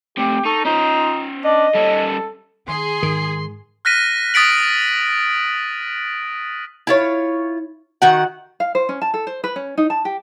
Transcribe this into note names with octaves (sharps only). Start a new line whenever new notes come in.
C3 A3 G4
D#4 A4 C#6
C#4 D#4 F4 C5
D4 D#5
G3 C#4 A4
D#3 G#4 C6
G#2 D#3
F6 F#6 A#6 B6 D#7
D#6 A6 B6 D7 F#7
E4 F4 C#5
D#3 F#4 F#5
F5
C5
C#4
A5
A4
C5
B4
C#4
D#4
A5
G4